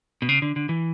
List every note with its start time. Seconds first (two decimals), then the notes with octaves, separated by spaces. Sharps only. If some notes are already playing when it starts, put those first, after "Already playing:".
0.22 B2
0.29 C#3
0.42 D3
0.56 D3
0.69 E3